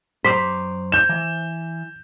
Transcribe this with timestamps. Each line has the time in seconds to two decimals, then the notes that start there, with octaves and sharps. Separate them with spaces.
0.24 F#2 C5 D5 A#5 B6
0.92 G6 E7
1.09 E3